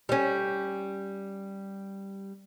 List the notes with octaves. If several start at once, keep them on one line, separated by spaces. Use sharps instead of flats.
G3 C#4